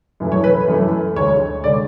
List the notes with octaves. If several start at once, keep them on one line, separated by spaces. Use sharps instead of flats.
F#2 E3 A3
C#5
B4
F#2 E3 A3
D2 D3 G#3 C#5
D3 G#3 D5